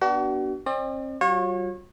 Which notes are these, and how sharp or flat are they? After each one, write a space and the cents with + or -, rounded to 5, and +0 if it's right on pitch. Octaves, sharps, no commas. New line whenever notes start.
B3 -25 D4 +0 F#4 +40
C4 +35 D5 +45
G3 -40 F4 +40 C#5 -30